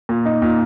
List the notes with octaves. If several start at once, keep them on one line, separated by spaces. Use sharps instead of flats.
A#2
D#4
A#2